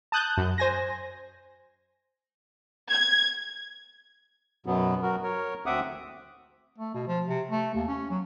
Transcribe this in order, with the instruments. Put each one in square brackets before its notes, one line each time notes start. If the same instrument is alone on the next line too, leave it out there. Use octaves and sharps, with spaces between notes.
[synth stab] A5 D#6 F#6 G6
F#2
C5 G#5 A#6
[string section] G#6
[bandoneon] F#2 B2 F#3 B3
F#3 F#4 A#4
A#4 C#5
D2 C4 E5 F#5 D6 D#6
[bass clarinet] A3
B2
F3
C3
A3
D#2
C#4
F#3